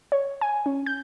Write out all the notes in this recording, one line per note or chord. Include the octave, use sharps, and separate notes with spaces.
C#5
G#5
C#4
G6